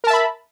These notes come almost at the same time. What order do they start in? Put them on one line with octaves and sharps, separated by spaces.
A#4 A5 E5 B5